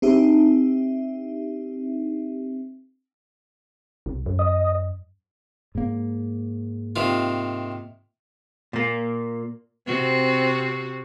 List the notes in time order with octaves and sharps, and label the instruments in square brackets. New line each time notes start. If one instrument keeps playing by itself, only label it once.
[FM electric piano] C4 D4 D#4 G4 E5
[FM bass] C2
F#2
[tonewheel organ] D#5
[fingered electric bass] G#2 A#3
[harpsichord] C3 D#3 F4
[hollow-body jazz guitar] A#2 A#3
[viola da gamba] C3 C4 F#4